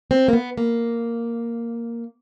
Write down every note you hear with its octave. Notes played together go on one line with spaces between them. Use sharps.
C4
A#3
B3
A#3